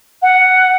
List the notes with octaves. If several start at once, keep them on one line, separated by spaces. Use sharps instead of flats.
F#5